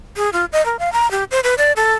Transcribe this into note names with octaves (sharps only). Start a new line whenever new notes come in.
G#4
F4
D#5
A#4
F5
A#5
G4
C5
B4
D5
A4